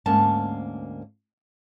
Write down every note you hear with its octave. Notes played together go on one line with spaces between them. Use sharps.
D2 G#2 A#3 C#4 A5